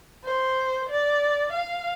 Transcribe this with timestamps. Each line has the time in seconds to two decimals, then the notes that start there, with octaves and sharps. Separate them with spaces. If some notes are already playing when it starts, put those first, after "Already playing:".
0.24 C5
0.89 D5
1.52 F5